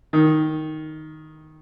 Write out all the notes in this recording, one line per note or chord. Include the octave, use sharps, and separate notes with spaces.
D#3